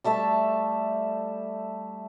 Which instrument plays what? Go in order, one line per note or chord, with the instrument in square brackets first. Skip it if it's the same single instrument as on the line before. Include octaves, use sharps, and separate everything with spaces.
[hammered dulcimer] G3 A3 E5 A5